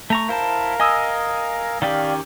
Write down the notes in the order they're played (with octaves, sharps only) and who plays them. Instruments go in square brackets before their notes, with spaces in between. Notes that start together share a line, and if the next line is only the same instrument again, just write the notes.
[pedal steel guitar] A3 A#5 C#6
[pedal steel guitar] E4 C5 A5 [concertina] A#4 F5
[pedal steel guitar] D#5 [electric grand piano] G#5 D#6 E6
[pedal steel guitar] D#3 C#4 G4 [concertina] D5 F5